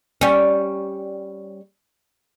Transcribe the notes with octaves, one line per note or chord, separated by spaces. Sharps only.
G3 C#4